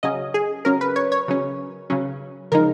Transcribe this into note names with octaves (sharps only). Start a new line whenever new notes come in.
C#3 F#3 C#4 D#5
G#4
C#3 F#3 C#4 A#4
B4
C#5
C#5
C#3 F#3 C#4
C#3 F#3 C#4
C#3 F3 G#3 D#4 A#4